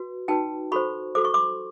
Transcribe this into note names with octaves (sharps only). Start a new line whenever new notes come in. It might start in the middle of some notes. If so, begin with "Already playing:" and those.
Already playing: F#4 B4
D#4 F#4 B4 G5 A5
F#4 A4 C5 B5 C#6
F#4 A4 C5 D6
C#6
C6 D6